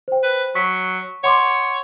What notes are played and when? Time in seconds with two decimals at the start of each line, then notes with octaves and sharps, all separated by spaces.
0.08 C5 G5
0.23 B4
0.55 F#3 C#6 B6
1.24 C#5 F#5 C6 D6